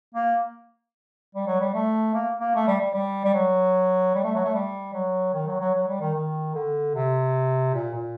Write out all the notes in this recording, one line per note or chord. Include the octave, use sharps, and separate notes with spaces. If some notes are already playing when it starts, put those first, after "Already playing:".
A#3
G3
F#3
G3
A3
A#3
A#3
A3
G3
G3
G3
G3
F#3
G3
A3
F#3
A3
G3
F#3
D#3
F#3
F#3
F#3
G3
D#3
D#3
D3
C3
A#2
A#2